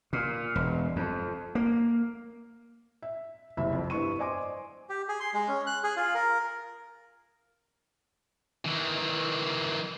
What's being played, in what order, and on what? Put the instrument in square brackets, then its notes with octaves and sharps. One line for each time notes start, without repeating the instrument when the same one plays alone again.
[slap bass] A#2
E1
F2
A#3
[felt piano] E5
F#1 C2 E5 B5
F2 C4
G2 B3 E4 C#6 D#7
C5 D5 D#5 G#5 C6 D6
[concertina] G4
G#4
C6
G#3
C#4
F#6
G#4
F4
A#4
[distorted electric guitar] D#3 E3